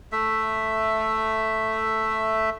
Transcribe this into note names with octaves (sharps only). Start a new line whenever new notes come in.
A3 E5